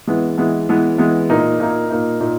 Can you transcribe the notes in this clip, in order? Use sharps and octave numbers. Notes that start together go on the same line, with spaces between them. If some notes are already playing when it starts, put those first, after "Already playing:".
E3 G#3 B3
E3 G#3 B3
E3 G#3 B3
E3 G#3 B3
A#2 A#3 D#4
A#2 A#3 D#4
A#2 A#3 D#4
A#2 A#3 D#4